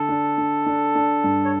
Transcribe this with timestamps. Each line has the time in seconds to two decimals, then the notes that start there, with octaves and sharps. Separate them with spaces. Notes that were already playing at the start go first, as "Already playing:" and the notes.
Already playing: D3 A4
0.09 D4
0.38 D4
0.66 D4
0.95 D4
1.24 G2
1.45 C#5